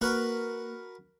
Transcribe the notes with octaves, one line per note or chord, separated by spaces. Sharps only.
A#3 F#4 A#4 B4